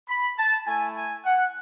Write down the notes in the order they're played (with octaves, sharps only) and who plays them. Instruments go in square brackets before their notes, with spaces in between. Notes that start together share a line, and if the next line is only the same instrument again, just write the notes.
[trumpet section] B5
A5
A3 E4 G#5
G#5
F#5